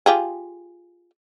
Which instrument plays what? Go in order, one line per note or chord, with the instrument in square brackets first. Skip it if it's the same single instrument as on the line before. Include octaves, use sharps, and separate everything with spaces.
[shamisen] F4 G4 G#4